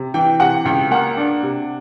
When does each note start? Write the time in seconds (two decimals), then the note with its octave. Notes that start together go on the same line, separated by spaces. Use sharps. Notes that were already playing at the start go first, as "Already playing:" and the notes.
Already playing: C3
0.14 E3 G5
0.40 C3 F#5
0.65 C#2 G5
0.91 A#3 F#5
1.17 D4
1.43 C3